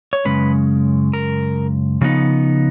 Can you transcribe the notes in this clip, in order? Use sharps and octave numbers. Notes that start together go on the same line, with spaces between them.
C#5
F#2 C#3 G#3 C#4 B4
A#4
C#3 F3 B3 D#4